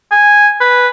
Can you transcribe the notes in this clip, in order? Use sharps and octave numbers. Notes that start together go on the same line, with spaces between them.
G#5
B4